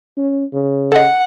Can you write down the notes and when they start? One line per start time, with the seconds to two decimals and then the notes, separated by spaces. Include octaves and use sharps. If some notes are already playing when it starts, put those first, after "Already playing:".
0.17 C#4
0.53 C#3
0.92 A4 D#5 F#5